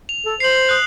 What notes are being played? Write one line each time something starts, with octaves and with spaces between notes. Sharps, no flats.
F7
A4
C5 C7 F#7
D#6 F#6